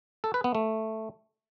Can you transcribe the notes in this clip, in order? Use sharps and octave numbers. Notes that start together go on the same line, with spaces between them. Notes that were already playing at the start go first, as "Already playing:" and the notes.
A4
B4
B3
A3